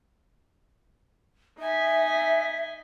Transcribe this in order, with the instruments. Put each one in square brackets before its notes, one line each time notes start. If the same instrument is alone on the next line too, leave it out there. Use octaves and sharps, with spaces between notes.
[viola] D#4 G#5 [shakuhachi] E5